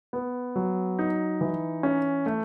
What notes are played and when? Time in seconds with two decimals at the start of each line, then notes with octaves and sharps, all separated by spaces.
0.13 B3
0.56 F#3
0.99 D#4
1.41 E3
1.83 C#4
2.26 A3